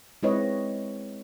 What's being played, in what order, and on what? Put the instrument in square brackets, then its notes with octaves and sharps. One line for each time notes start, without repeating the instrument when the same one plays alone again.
[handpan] G#3 C4 E4 B4 C#5 D#5